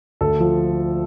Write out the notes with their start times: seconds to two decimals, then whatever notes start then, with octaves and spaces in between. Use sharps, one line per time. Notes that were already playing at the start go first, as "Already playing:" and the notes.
0.21 D2 A4
0.40 F3